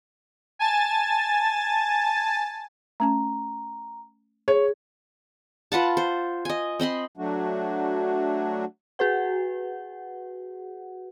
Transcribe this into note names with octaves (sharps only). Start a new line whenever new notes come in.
G#5 A5 A6
A3 C#4 A5 A#5
G#4 C#5
F4 B4 F#5 A5
C5
D#5 G#5
C4 D#5 B5 C6
F#3 A3 D4 F#4
F#4 G#4 B4 F#5